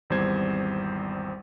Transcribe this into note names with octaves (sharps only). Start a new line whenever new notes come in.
G#1 E2 G3 C4 C5 G#6